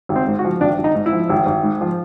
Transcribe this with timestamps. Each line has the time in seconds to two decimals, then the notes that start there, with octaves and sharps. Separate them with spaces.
0.09 G#1
0.16 C4
0.28 G#2
0.39 F#4
0.45 F3
0.61 G#1 D4
0.78 G#1
0.84 D#4
0.95 G#2
1.06 E4
1.13 F3
1.29 G#1
1.46 G#1
1.63 G#2
1.81 F3